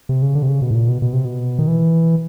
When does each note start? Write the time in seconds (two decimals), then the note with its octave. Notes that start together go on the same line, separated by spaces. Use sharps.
0.09 C3
0.22 C#3
0.35 D3
0.43 C3
0.48 C#3
0.62 B2
0.71 A2
0.75 A#2
0.89 B2
1.02 B2
1.13 C3
1.25 B2
1.59 D#3
1.68 E3